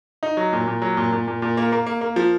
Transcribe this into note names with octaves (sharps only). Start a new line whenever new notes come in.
D#4
F#3
A#2
A#2
F#3
A#2
A#2
A#2
A#2
A#3
A#3
A#3
A#3
F3